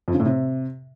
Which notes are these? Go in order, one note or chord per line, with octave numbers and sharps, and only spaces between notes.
F2
C#3
A2
C3